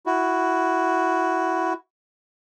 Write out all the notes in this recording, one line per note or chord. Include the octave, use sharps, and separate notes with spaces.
E4 F#4